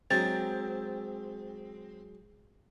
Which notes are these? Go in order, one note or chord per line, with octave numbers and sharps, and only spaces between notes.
F#3 G#3 C4 A#4 A6